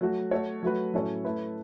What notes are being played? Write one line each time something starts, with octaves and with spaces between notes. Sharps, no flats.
F#3 A3 F#4
A3 F#4 C#5
F#3 A3 F#4 B4
A2 F#3 C#4 A4 C#5
A3 E4 B4